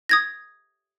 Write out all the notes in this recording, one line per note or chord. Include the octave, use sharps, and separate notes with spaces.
D#6 G#6 A#6